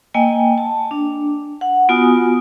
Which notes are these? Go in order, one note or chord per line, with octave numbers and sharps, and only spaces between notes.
A#3 D#5 G5 G#5
A5
D4
F#5
B3 F4 F#4 G#5 D#6